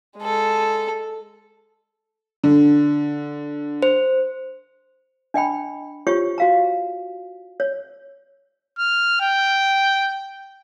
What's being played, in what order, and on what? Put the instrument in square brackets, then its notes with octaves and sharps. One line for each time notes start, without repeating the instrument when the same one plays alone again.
[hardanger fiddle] G#3 A4
[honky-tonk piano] D3
[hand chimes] C5
[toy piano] D4 D#5 G5 B5
F4 G4 C5 C#5 C#6
F#4 F5 A#5
C#5
[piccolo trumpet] F6
G5